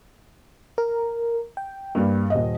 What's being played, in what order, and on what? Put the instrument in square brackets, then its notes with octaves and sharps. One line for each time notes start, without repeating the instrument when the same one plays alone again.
[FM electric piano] A#4
G5
[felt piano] G2 G3 [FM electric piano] A#3
[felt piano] D#1 D#5